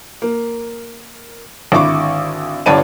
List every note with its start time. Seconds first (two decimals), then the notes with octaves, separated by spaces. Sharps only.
0.22 A#3
1.72 G#1 D3 E4 C#6 D6
2.66 G1 G2 C#5 D5 A5 D#7